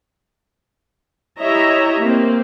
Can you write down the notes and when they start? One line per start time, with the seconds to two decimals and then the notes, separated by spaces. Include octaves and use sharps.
1.41 E4 G4 C#5 D#5 E5 A#5
2.01 A#3 C4